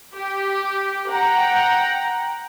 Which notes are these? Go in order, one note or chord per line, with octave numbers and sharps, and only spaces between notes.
G4
F#5 G5 A#5